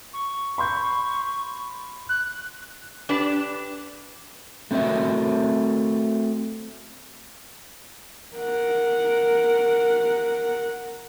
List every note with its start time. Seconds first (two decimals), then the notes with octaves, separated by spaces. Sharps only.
0.14 C#6
0.58 B5 C6 G6
2.09 F#6
3.09 D4 G4 B4 D5
4.71 A3 C4 F#4 A#4 E5
8.36 A#4 F#5